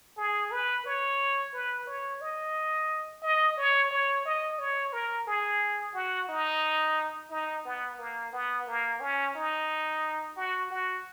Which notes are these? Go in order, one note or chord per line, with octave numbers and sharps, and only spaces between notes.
G#4
B4
C#5
B4
C#5
D#5
D#5
C#5
C#5
D#5
C#5
A#4
G#4
F#4
D#4
D#4
B3
A#3
B3
A#3
C#4
D#4
F#4
F#4